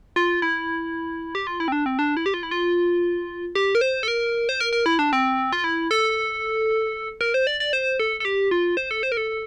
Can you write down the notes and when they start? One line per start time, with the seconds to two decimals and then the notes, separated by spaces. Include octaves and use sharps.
0.16 F4
0.42 E4
1.35 G4
1.47 F4
1.60 E4
1.68 C4
1.72 D4
1.86 C4
1.99 D4
2.17 E4
2.26 G4
2.34 F4
2.43 E4
2.51 F4
3.55 G4
3.75 A#4
3.81 C5
4.03 A4
4.08 A#4
4.49 C5
4.60 A#4
4.73 A#4
4.86 E4
4.99 D4
5.13 C4
5.53 F4
5.64 E4
5.91 A4
7.21 A#4
7.34 C5
7.47 D5
7.60 D5
7.73 C5
8.00 A4
8.20 A4
8.25 G4
8.51 F4
8.77 C5
8.91 A4
9.03 C5
9.12 A#4
9.17 A4